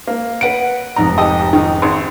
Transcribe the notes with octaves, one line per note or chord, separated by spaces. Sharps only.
A#3
B4 F#5 D7
F1 G#2 A#5
G4 A4 D#5
D#3
G#1